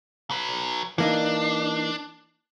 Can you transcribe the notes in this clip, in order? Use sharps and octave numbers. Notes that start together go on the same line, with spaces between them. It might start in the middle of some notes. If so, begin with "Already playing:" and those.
F#3 B4
E3 A#3 D4 D#4